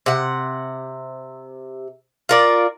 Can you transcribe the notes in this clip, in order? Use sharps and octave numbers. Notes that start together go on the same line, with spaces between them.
C3 F#5
F4 A#4 D5